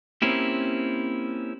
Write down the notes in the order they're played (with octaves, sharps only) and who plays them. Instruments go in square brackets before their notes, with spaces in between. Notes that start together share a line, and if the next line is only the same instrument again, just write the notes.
[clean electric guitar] A#3 C4 C#4 E4 G4